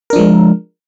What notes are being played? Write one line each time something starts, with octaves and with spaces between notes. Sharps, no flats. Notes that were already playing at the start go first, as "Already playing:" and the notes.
F3 G#3 D4 A#4